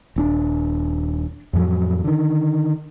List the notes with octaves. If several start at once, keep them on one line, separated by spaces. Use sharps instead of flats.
D#1 C4 D4
F2 A2 F3 F#3
D3 D#3